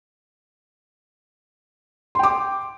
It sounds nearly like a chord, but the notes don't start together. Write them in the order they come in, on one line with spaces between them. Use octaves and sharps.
C6 G5 D6